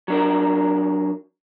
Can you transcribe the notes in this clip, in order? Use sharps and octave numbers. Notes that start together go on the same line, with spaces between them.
F#3 D4 A#4